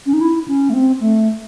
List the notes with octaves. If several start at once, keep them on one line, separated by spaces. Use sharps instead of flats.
C#4
D#4
E4
C#4
A3
C4
A3